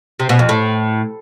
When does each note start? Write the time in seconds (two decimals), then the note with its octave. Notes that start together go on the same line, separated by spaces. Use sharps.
0.20 C3
0.29 B2
0.39 F2
0.49 A2